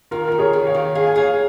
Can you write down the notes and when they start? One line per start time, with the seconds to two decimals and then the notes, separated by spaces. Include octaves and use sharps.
0.11 D#3 F4 A#4
0.28 D#3 A#4
0.39 G#4 C#5
0.53 D#3
0.67 C#5 F5
0.75 D#3
0.95 G#4 F5
1.07 G#5
1.16 G#4 C#5 F5